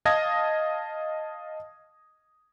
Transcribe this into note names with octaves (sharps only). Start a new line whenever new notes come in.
D#5 F5 A5 D#6 G#6 A#6